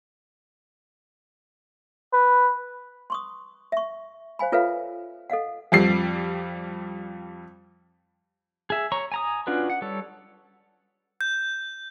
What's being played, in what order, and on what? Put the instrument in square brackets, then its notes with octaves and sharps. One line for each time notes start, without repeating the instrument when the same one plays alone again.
[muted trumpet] B4
[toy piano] C6 C#6 D#6
E5 C#6
C5 F5 G#5 B5
F4 A4 B4 C#5 E5 F5
A4 D#5 F5 F#5
[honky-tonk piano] F2 G3 C7
[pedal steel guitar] G#4 E5
C#5 A#5 C#6
G#5 A#5 D#6
C#4 D4 F4 F#4 B4
F#5
G3 A4 C#5
[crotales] G6